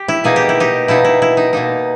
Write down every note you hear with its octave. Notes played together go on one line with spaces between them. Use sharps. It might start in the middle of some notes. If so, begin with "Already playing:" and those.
Already playing: G4
E4
B2 A#3 D#4 G#4
G4
E4
D#4 G4
B2 A#3 D#4 E4
E4
E4
D#4
B2 A#3 D#4